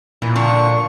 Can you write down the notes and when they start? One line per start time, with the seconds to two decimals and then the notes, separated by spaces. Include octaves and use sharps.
0.22 A#2 E3
0.36 D3 F3 D4 C#6